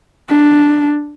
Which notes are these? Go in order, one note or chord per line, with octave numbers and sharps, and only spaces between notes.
D4